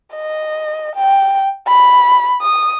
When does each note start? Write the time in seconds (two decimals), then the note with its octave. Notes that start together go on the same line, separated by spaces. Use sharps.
0.15 D#5
0.96 G5
1.67 B5
2.42 D#6